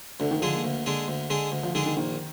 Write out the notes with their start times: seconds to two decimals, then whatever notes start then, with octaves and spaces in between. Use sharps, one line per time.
0.20 D2 D3
0.31 D#3
0.42 D3 F3 G#3 D4 G#4
0.52 A#3
0.64 D2
0.86 D3 G#3 D4 G#4
1.08 D2
1.30 D3 G#3 D4 G#4
1.52 D2
1.63 F3
1.75 D3 D#3 G#3 D4 G#4
1.86 D#3
1.97 A#1 D#3